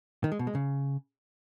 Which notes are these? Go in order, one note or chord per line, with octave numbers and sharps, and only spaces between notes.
D#3
G#3
B2
G#3
C#3